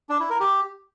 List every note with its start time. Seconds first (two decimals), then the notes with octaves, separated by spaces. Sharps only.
0.09 D4
0.20 E4
0.30 A#4
0.40 G4